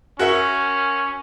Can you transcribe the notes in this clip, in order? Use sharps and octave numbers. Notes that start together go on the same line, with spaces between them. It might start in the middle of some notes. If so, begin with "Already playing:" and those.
C#4 F#4 A#4 E5